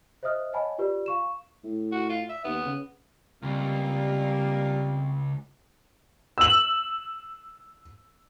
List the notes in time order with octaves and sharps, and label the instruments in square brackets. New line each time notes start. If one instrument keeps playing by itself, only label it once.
[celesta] C5 D#5 E5 D#6 F6
C#5 D#5 F#5 G#5 A5 B5
F4 G4 B4 D5
F5 C#6 E7
[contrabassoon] A2
[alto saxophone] F#4
F4
E5
[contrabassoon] D#2 [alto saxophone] B3
[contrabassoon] C#3
[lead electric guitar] C#2 [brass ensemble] G3 [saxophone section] A#3 F4 [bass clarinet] C4
[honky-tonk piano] E6 F#7